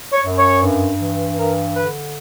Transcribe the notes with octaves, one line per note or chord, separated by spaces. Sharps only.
C#5
F#2
C#5
G2
E3
G2 A#4
D3 B4